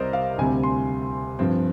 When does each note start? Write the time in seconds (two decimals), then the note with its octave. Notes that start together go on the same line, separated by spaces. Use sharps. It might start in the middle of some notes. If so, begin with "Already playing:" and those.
Already playing: C2 C3 G3 A#4 C5 D5 D#5
0.13 F5
0.38 D2 C3 G3 C4 G#5
0.63 C6
1.39 G2 F3 C4